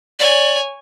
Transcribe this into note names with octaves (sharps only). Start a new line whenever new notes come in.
C#5 D5 G#5